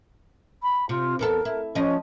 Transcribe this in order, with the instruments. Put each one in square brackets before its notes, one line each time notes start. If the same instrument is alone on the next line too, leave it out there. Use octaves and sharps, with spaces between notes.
[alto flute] B5
[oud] C3 [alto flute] F4
[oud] E2 B3 A4 [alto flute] A#4
[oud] E4
[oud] F3 D#5 [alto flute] C#4